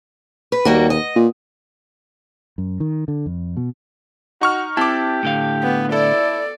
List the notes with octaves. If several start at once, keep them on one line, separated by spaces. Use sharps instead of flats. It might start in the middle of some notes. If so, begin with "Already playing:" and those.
B4
D#2 G3 A#3 F#4
D#5
A#2
F#2
D#3
D3
F2
B2
D#4 F#4 C#6 F6
C4 E4 G4 A5 D6
A2 D3 F5
B3
E4 A4 D5